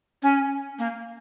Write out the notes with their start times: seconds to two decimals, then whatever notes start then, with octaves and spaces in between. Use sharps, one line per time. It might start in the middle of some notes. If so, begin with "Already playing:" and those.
0.22 C#4
0.79 A#3